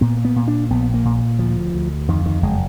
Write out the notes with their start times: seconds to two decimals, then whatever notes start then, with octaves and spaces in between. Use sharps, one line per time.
0.01 A#2 B3
0.25 B3
0.36 A#2
0.48 D4
0.70 A#1 B3
0.94 A#3
1.05 A#2
1.39 D2 F3
1.74 D2
2.08 F2 D#3
2.26 D#3
2.42 F#1 G#3